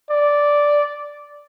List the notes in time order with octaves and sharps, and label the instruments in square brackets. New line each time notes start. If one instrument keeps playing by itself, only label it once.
[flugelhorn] D5